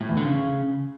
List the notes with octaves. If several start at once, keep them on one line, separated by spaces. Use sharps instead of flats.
A2
E2
D3
C#3